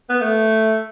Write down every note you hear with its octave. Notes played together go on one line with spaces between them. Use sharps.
B3
A3